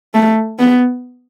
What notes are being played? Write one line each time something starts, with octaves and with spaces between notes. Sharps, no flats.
A3
B3